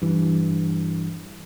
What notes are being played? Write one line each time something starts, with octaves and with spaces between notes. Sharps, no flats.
G2 E3